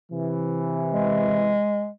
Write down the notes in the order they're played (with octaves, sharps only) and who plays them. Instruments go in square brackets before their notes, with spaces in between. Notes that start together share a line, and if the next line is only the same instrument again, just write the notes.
[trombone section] C3 E3
[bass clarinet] G#3